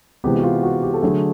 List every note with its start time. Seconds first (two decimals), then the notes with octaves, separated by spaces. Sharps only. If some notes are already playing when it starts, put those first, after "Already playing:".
0.24 C3 E3 G#3 B3 G4
0.38 F#4
0.43 F4
0.63 F#4
0.83 G4
0.94 A4
1.02 D3 F#3 A3 G#4